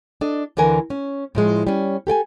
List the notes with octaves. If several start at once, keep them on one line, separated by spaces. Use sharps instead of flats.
D4 A4 D#5
D2 D3 E3 A#4 G#5
C#4
A2 F3 G#3
G3 C#4
G4 A4 G5 G#5